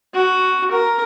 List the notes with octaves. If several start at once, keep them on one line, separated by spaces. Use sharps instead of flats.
F#4
A#4